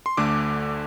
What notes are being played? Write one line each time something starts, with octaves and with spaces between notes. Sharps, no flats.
C6
D2 D3 A3 D6